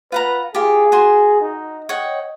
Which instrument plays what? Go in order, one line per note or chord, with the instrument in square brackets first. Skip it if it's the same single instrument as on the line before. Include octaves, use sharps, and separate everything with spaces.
[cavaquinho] F4 F#5 A#5 [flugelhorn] B4
[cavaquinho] F4 G4 [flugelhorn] G#4
[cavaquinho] F#4 G#5 C6
[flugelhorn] D#4
[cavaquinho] C#5 F#5 G5 [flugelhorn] D#5